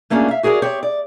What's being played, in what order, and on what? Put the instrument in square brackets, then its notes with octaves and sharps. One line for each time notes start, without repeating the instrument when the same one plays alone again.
[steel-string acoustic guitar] A3 A#3 C#4 D4 F4 G#4
E5 F5
F#4 G#4 A#4 C#5 D5
C4 G4 C#5
D5